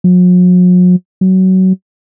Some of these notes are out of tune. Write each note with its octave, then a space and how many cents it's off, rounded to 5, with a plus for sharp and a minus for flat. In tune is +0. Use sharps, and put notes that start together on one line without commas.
F#3 -45
F#3 +20